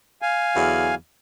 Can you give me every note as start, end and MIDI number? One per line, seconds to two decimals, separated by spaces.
0.22 0.95 77
0.22 0.95 80
0.54 0.94 40
0.54 0.94 50
0.54 0.94 54